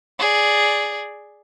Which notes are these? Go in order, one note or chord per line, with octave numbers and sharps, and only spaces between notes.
G#4 D5